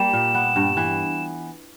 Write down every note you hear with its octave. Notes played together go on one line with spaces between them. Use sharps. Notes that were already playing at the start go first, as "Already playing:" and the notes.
Already playing: G3 A#3 E7
A#2
B3
G2
E3